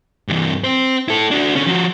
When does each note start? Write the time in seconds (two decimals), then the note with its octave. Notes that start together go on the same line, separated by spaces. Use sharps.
0.28 G2 E3
0.64 C4 C5
1.08 E4 A4
1.31 D4 F#4
1.55 D3 C#4
1.66 F3 F#4